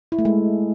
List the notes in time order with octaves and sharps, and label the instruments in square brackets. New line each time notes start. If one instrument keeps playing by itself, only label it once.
[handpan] E4
A3
G#3